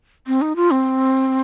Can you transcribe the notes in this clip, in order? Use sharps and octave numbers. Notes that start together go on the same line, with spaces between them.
C4
D#4
F4
C4